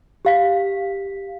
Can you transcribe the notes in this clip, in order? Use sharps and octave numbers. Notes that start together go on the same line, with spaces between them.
G4 F5 B6